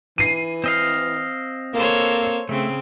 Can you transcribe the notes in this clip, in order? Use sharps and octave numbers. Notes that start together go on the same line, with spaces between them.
E3 C7 D#7
C4 D#5 F5
A#3 A4 C5 C#5
C#3 A3 C4